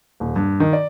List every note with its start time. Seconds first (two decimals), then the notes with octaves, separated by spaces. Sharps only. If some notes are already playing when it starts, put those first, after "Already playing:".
0.20 D#1
0.36 G2
0.60 D#3
0.73 D5